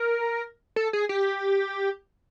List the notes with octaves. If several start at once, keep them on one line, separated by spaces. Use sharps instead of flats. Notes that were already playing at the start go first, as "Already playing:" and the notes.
Already playing: A#4
A4
G#4
G4